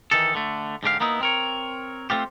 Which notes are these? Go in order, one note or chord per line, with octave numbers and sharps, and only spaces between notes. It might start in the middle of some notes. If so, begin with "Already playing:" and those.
D#3 E3 D#4 A4
D3 A3
G#2 D3 G4 F5
A#3 B3 D#4 E4
C4 A#4 C#5
A3 C4 F4 G4